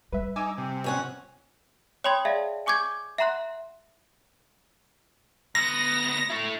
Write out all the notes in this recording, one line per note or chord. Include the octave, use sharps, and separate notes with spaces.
G3 B4 E5
D#4 G#5 D6 E6
C3
F2 C#4 F#5
C#5 G5 B5 C6 D#6 G#6
G#4 D5 E5 F5 A5
G#5 C#6 D6 G6 G#6
E5 F#5 A#5 C6 F#6
D2 B3 A#6
A3 E4